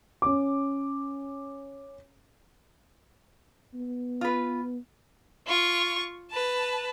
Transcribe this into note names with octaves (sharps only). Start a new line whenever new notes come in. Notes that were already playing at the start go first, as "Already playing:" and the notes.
C#4 D6
B3
F4 B4
F4 C#6
B4 A5